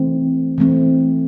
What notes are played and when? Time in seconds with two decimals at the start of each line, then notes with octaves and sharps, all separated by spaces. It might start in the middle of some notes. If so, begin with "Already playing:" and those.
Already playing: E3 A3 C4
0.58 E3 A3 C4